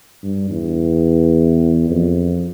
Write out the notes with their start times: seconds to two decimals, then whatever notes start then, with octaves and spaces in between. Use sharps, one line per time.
0.23 G2
0.50 E2
1.90 F2